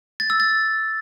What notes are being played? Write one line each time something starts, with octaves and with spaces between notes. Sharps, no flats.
A6
E6
A6